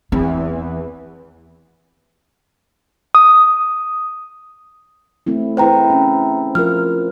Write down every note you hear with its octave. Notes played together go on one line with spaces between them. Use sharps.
E2 E3 C4
D#6
A3 C4 E4
E4 G#4 B4 C5 G5 A#5
C#4
F3 F4 A#4 F6